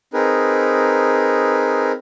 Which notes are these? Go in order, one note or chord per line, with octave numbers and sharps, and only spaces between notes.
C4 D#4 G#4 A#4 B4